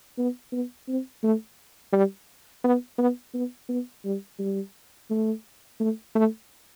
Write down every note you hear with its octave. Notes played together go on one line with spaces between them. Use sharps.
B3
B3
C4
A3
G3
B3
B3
B3
B3
G3
G3
A3
A3
A3